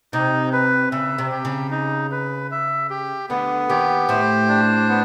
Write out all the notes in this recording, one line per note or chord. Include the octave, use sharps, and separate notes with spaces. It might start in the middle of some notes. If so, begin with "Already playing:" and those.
C3 D#4
B4
C#3 E5
C3
G4
C#3
D#4
B4
E5
G4
D2 D3 B3
D#2 D#3 G4
A2 A3 C5
D4
B3